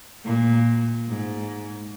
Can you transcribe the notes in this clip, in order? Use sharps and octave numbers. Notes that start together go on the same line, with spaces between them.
A#2
G#2